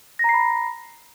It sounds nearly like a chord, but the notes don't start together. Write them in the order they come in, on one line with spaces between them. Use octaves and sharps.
A#6 A#5 C7 B5